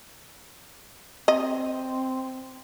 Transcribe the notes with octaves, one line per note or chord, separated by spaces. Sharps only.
C4 D#5